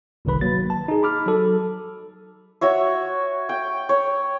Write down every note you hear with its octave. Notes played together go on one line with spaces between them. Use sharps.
G1 C2 C3 D#3 B4 B5
F#3 A#3 A6
A5
D#4 G#4
B5 D6 F6
F#3 A4
F#4 C#5 E5
G5
C#5